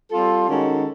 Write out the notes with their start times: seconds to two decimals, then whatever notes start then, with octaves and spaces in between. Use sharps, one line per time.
0.11 G3 C4 F4 A4
0.49 D#3 G#3 C#4 F#4 A4